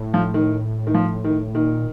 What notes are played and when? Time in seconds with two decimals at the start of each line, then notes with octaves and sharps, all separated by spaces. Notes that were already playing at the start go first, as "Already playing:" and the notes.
Already playing: A2
0.14 F3
0.34 D#3
0.87 D#3
0.94 F3
1.24 D#3
1.54 A#2 D#3